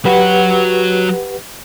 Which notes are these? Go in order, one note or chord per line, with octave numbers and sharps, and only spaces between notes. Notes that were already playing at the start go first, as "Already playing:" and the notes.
F#3 F#4 G4 B4 F#5